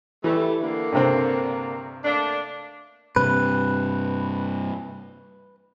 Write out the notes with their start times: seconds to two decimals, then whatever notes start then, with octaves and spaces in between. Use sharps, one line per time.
0.24 E3 G3 A3
0.62 D3 A#3
0.93 G2 C3 C4
2.04 A3 A#3 D4
3.16 G2 C3 B4